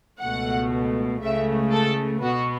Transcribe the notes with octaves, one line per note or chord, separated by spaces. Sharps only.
C#2 B2 A3 F#5
C#2 C#3 A3 E5
A4
B2 B3 F#4